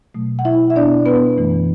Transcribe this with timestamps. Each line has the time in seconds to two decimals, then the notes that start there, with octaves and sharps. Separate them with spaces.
0.14 B2 F#3 A3
0.39 F#5
0.45 E4 E5
0.70 E5
0.75 B2 B3 D4 D5
1.06 B3 B4
1.37 F#2 E3 A3